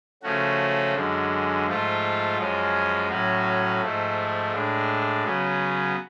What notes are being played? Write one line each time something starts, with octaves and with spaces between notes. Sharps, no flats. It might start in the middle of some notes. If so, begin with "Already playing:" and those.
C#3 F3 A3 C#4 F#4
F#2 D3 G#3
G#2 F3 A3 F4
F#2 F3 G#3 C#4
A2 F#3 C#4 F#4
G#2 F3 A3
A2 G#3 D4
C#3 F#3 B3